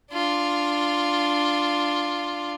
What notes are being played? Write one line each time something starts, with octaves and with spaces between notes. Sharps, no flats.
D4 F4